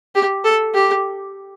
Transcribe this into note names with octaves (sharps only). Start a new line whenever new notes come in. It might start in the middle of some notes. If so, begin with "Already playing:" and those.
G4
A4
G4